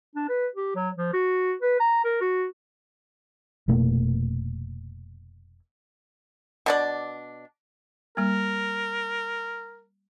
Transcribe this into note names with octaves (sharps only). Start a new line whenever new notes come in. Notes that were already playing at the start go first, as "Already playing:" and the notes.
D4
B4
G4
F#3
F3
F#4
B4
A#5
A#4
F#4
F1 B2 A3 A#3
B2 D4 D5
G3 A#3 A#4